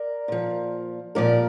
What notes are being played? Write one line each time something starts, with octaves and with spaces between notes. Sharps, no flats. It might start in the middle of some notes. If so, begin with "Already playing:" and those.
Already playing: A#4 D5
A#2 F3
A#2 F3 A#4 D5